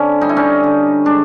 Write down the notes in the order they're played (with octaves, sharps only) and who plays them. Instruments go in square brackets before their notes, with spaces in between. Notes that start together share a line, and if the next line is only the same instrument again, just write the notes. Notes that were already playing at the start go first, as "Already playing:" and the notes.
Already playing: [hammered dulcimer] D3 C4 C#4
G3 D#4
E4
C#4 D#4
D3
G#3 D4